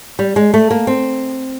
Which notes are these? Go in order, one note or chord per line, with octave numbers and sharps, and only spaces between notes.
G3
G#3
A3
A#3
C4